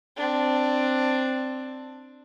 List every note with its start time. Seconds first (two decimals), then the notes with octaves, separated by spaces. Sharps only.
0.17 C4 D4